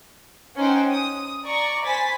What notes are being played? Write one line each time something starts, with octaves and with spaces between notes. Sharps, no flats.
C#4 D#4 C5 F#5 G5
D#6
D5 A#5 C#6
C5 G#5 B5 A6 B6